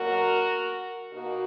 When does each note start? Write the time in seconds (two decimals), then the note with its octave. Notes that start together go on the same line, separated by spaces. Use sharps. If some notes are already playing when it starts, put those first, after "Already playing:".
Already playing: B2 F#3 A#3 F#4 A#4
1.13 B2 A#3 D#4 F#4